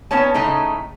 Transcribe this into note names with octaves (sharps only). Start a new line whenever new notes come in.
B3 C#4 D#4 C#5 A5
A2 C#3 A3 D#4 A#5